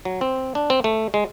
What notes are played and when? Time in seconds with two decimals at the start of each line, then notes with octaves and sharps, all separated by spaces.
0.05 F#3
0.21 C4
0.55 D4
0.70 C4
0.84 A3
1.14 G#3